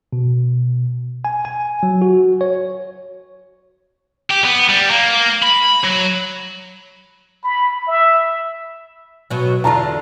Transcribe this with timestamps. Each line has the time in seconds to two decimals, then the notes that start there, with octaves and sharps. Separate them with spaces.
0.13 B2
1.25 G#5
1.45 G#5
1.83 F#3
2.02 F#4
2.41 C#5
4.31 G4
4.45 B3
4.70 G3
4.91 A#3
5.43 B5
5.84 F#3
7.44 B5
7.87 E5
9.30 B2 F#3
9.64 E2 D3 F4 A5 A#5